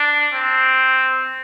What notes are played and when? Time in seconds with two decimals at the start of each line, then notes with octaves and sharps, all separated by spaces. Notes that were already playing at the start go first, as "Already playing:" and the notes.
Already playing: D4
0.34 C4